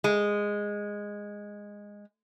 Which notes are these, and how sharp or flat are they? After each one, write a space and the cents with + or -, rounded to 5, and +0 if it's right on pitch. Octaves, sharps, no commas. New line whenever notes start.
G#3 -10